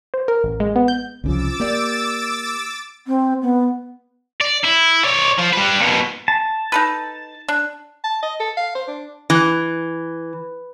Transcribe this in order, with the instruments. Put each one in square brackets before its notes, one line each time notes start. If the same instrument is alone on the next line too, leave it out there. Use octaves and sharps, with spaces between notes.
[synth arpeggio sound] C5
A#4
A1
G#3
B3
G6
[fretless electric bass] C2 C#3 F3 [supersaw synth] D6 E6 A6
[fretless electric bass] A#3 [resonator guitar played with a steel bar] G4 D5
[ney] C4
B3
[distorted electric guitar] D5
E4
C#5 D5
F3
G3 B4
D#2 B2
[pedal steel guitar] A5
[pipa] D#4 A4 B4
D4
[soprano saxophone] A5
D#5
A4
F5
C5
D4
[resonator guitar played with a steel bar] E3